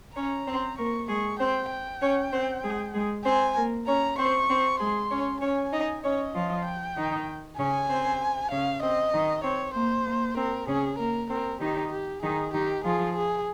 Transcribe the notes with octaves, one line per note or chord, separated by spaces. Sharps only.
C#4 C#5 A#5
C4 C5
A#3 A#4 C#6
G#3 G#4 C#6
C4 C5 G5
G5
C#4 C#5
C4 C5
G#3 G#4
G#3 G#4
C4 C5 G#5
A#3 A#4
C#4 C#5 A#5
C4 C5 C#6
C4 C5
G#3 G#4 C6
C#4 C#5
C#4 C#5 G#5
D#4 D#5
C#4 C#5 D#5
F3 F4
G5
D#3 D#4
C#3 C#4 G#5
C4 C5
C#3 C#4 F5
C4 D#5
D#3 D#4
C4 C#5
A#3 C5
A#3
C4 A#4
C#3 C#4 G#4
A#3 A#4
C4 A#4
D#3 D#4 G4
G4
D#3 D#4 G#4
D#3 D#4 G4
F3 F4 G#4
G#4